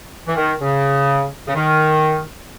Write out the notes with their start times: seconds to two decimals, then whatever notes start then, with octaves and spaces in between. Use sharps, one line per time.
0.27 E3
0.36 D#3
0.59 C#3
1.47 C#3
1.54 D#3